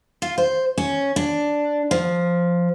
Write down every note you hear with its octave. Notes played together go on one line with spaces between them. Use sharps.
F4
C5
C#4
D4
F3